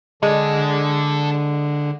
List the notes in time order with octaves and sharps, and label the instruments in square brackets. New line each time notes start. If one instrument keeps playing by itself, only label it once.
[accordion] D3 [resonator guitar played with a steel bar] G#3 [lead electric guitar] D4 A4